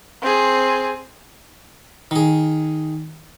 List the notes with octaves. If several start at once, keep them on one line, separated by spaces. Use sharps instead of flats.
C4 G#4
D#3 G#4